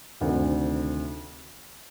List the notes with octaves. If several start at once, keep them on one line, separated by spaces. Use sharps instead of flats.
D2 C3 D#3